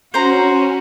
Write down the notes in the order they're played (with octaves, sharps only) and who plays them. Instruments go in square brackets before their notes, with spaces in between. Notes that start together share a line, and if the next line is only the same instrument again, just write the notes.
[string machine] C#4 [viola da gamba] F#4 [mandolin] C5 A#5